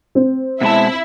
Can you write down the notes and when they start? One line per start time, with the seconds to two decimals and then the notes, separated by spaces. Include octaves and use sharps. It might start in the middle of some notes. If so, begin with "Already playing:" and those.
0.15 C4
0.61 B2 G#3 E4 E5 A5